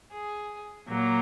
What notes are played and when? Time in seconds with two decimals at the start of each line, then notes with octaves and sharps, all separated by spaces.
0.12 G#4
0.89 A#2 F#3 A#3